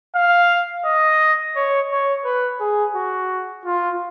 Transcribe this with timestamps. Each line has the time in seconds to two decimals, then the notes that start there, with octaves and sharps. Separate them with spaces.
0.16 F5
0.85 D#5
1.56 C#5
1.90 C#5
2.25 B4
2.60 G#4
2.95 F#4
3.65 F4